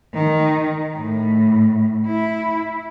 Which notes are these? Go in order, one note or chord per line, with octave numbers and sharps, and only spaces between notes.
D#3
A2
E4